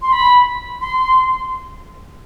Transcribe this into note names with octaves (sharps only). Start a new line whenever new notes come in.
C6
B5
C6